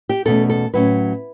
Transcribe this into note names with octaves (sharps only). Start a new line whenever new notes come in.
G4
E2 B2 A3 C#4 A4
A4
A2 F#3 C#4 B4